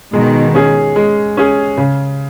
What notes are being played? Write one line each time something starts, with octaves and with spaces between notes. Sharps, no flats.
B2 D#3 G#3
C#4 G#4
G#3
C#4 G#4
C#3